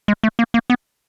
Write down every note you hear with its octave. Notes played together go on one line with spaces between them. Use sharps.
G#3
A3
A#3
A#3
B3